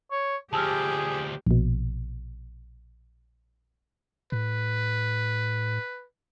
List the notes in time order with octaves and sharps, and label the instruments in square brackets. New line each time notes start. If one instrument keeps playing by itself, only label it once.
[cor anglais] C#5
[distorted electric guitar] D2 F3 [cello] G4 [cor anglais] G#4 [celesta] A5 E6 F6
[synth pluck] A#1 B2
[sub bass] A2 [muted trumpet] B4